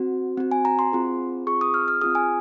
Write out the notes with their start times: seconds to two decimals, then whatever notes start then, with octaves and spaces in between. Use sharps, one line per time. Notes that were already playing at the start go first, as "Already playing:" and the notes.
Already playing: C4 F#4
0.37 C4 F#4
0.52 G#5
0.65 A#5
0.79 C6
0.93 C4 F4 G#4
1.47 C4 F4 G#4 C#6
1.61 D#6
1.74 F6
1.88 F6
2.01 C4 F4 G#4 D#6
2.15 G#5